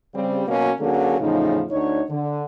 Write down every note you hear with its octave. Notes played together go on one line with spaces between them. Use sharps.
C#3 G3 C4
B2 F#3 A#3 C#4 F#4
D3 F#3 A#3 C#4 G#4 A4
E2 A2 C#3 F3 D#4
D2 D4 D#4 C#5
D3